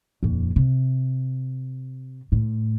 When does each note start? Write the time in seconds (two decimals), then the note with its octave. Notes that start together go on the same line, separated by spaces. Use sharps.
0.23 D#1 F2
0.56 C3
2.32 A2